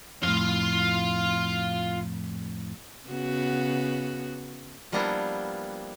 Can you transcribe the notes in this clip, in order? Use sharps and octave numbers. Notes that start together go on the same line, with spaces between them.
F2 A2 F4 F5
C#3 B3 F#4
F3 G3 A#3 B3 D4 E4